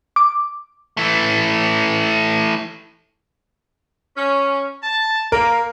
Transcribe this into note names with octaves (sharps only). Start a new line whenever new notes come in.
D6
E3 A3
C#4
A5
A#3 A#4